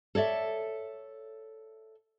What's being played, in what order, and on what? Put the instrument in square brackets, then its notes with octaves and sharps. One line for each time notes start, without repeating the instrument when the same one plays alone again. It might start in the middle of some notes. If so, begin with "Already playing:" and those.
[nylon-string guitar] A4 C#5 D5 E5